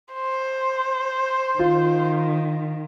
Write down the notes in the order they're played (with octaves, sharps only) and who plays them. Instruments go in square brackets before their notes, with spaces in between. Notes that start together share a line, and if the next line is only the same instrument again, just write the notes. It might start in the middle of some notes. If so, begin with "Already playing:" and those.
[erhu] C5
[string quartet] D#3 [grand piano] F4